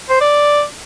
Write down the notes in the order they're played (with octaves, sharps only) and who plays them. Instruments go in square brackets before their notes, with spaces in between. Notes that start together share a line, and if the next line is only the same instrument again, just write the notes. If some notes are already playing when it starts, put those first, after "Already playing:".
[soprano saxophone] C5
D5